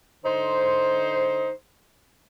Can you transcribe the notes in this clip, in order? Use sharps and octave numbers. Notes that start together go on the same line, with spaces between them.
D3 D#4 C5